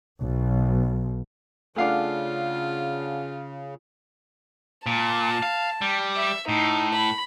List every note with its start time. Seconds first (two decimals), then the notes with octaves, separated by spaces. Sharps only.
0.21 B1
1.76 C#3 A3 D4 F4 F5 F#5 G#5 D6
4.86 A#2 A5
5.43 F5
5.81 G3
6.16 E5
6.49 A2 D#4
6.95 B5